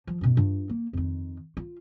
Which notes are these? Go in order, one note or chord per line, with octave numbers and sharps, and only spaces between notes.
F3
F#2 B2
G2 F4
A#3
F2 D#3
F4